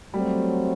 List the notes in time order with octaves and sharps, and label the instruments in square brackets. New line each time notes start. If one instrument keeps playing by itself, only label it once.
[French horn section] F#3 A3 C4 [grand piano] G3